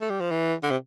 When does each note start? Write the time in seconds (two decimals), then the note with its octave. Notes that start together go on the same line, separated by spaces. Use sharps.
0.01 A3
0.10 G3
0.20 F3
0.31 E3
0.63 D3
0.71 C3